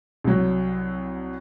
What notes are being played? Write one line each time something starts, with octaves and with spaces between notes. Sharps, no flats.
C2 F#3